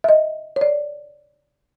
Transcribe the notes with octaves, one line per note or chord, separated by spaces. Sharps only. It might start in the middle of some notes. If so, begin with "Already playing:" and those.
E5
D#5
C#5
D5